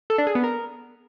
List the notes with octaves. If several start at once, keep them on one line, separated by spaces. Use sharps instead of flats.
A4
D4
G#4
B3
A#4